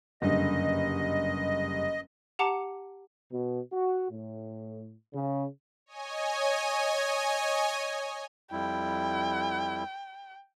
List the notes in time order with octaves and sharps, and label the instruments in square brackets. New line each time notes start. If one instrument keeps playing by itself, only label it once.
[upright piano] F#1 G2 D3 [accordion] D#5
[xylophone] G4 F#5 A5 A#5 D6 C#7
[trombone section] B2
F#4
A2
C#3
[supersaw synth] C#5 D#5 G#5
[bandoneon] F2 G3 E4 [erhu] G5